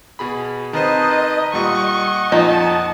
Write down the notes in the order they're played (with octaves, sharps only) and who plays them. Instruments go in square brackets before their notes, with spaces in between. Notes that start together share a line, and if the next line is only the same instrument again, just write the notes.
[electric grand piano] B2 G#4 B5
[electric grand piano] D#3 C4 C5 [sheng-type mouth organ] D#4 B4 A5 [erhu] D#5
[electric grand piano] A#2 G3 [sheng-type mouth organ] D#5 F#5 [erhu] C#6
[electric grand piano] F2 A#2 F3 [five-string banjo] D#4 [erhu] A5